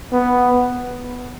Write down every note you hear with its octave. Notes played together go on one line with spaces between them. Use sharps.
B3